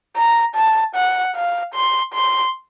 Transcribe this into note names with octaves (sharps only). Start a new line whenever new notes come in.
A#5
A5
F#5
F5
C6
C6